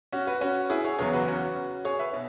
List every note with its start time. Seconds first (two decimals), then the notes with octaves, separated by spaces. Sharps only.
0.12 C#4 F#4
0.27 F#4 B4
0.41 C#4 F#4
0.70 E4 G#4
0.84 G#4 C#5
0.99 E2 C#3 F#3 B3 G#4 C#5
1.13 F#4 B4
1.28 C#4 F#4
1.85 G#4 C#5
1.99 B4 E5
2.13 B2